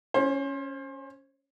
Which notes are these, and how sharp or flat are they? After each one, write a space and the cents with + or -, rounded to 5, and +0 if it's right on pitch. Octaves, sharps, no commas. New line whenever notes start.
C#4 +0 C5 +30